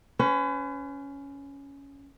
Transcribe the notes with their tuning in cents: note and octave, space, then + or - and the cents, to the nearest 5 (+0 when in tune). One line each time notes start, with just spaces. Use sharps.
C#4 +10 B4 +40